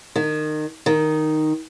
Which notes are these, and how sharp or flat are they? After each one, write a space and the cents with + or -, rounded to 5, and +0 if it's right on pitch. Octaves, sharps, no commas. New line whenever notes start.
D#3 -25
D#3 -5